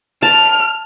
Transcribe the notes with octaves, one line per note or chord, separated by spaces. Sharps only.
A5 F6